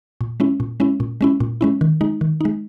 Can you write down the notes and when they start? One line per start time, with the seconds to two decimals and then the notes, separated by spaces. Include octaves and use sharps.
0.21 A#2
0.40 G#3 C#4 E4
0.60 A#2
0.80 G#3 C#4 E4
1.00 A#2
1.21 G#3 C#4 E4
1.40 A#2
1.61 G#3 C#4 E4
1.81 D#3
2.01 G#3 D#4
2.21 D#3
2.41 G#3 D#4